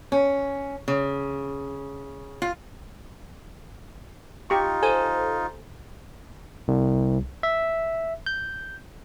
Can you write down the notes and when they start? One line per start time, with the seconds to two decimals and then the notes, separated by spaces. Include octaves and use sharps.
0.12 C#4
0.88 C#3
2.42 F4
4.50 D#4 F4 G4 C#6
4.83 A4 C5 G#5
6.68 C2
7.43 E5
8.26 G6